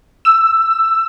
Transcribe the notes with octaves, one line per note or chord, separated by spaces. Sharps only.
E6